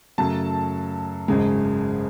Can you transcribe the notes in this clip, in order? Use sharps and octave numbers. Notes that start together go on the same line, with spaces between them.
F#2 C#3 F#3 A3 A5
G#1 F#2 C#3 G#3